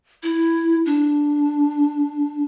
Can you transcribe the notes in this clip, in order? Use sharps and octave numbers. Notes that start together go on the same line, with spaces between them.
E4
D4